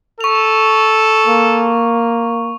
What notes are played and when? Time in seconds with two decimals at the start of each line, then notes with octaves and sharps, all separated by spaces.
0.21 A4 C#6 F7
1.27 A#3